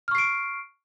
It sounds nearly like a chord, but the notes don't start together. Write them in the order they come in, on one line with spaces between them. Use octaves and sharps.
F6 C#6 C7 D7